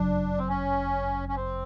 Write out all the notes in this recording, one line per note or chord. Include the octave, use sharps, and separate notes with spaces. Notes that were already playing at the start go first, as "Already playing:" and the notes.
Already playing: G1 F#2 C#3 F#3 D4
C4
C#4
C#4
C4